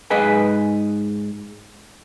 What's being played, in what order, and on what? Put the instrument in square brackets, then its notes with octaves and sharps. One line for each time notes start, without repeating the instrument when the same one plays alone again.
[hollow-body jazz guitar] G#2 G#4 B4 D#5 G#5